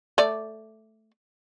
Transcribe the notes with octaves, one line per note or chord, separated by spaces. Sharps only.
A3 D5